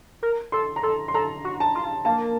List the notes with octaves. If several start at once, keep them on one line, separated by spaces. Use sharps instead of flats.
A#4
A4 C6
A#5
A4 C6
C6
A4 A#5
F#4
A5
F4
A#3 A5